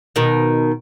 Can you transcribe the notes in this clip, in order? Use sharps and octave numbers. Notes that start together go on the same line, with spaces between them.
B2 D#3